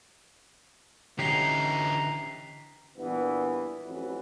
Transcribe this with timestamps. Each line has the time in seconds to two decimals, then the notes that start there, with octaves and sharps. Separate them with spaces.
1.19 D3 E3 C#4 D#4 G4 A#5 B6 C7
2.97 G2 A#2 E3 B3
3.83 A1 F2 E3 F#3 B4